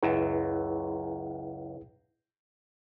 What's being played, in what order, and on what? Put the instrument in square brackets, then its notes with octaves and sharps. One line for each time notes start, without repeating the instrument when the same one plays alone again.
[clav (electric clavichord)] C#2 F#2 [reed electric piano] E4 G#4 B4